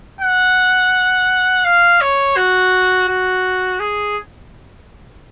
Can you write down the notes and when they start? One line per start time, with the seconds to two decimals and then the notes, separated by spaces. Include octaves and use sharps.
0.21 F#5
1.65 F5
2.01 C#5
2.36 F#4
3.08 F#4
3.80 G#4